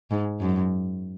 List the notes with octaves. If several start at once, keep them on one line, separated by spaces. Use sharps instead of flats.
G#2
F#2